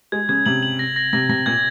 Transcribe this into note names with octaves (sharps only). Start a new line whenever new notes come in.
G#3 G#6
C#3 G#6
C3 F#7
F#7
A#6
A#6
C3 A#6
C3 A#6
A#2 G#6